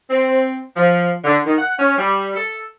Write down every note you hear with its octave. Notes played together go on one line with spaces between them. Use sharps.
C4
F3
D3
D#3
F#5
C#4
G3
A4